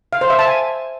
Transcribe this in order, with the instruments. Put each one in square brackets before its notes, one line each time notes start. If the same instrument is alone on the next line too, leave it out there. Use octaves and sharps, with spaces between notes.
[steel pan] F5
C5
E5
A5
G#5